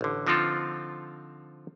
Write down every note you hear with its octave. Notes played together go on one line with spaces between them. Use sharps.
A1 D3
D3 F3 C4 D#4 F4 A4